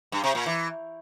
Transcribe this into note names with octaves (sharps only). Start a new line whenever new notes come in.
G2
C3
A#2
E3